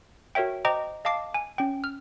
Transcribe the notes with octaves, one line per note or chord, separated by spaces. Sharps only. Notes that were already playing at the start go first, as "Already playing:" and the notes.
F#4 A#4 C#5 E5 G5
C5 D#5 G5 A#5 D6
D#5 F5 A5 D6 C7
G#5
C#4 G5
F6